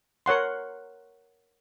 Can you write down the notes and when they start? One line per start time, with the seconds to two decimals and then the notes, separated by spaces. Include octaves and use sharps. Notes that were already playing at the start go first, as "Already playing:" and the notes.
0.26 A#4 C#5 F#5 C6